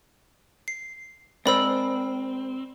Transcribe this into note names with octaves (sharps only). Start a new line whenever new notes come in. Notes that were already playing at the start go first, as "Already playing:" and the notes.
C7
G#3 C4 A#4 C5 D5 B5 E6